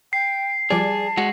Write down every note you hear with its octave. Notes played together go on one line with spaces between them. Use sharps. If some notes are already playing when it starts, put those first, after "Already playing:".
G5 C7
F3 G3 G#4 D5 A5
G#3 F#4